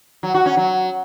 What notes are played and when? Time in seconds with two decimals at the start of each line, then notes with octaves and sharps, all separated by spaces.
0.23 F#3
0.34 F#4
0.46 C#4
0.57 F#3